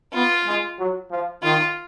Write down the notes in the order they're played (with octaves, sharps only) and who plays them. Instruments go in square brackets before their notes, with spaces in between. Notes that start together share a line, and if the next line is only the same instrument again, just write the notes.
[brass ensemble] B3 [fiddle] F4
[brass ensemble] G#3
F#3
F3
[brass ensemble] D#3 [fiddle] F4